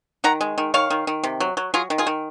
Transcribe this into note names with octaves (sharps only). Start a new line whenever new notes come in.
D#3 F#5 A#5
G#3
D#3
D#3 C#5 F5
D#3
D#3
C3
F#3
F#3
F#3 F4 G#4
D#3
F4 G#4
D#3